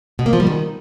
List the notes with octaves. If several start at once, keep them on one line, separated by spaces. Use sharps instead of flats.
B2
A#3
F3
G3
D#3